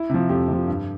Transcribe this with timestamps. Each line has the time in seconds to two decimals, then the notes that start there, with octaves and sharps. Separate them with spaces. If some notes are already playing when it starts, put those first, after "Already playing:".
Already playing: E4
0.10 C3 F3
0.29 F2 G4
0.48 C3 F3
0.67 G2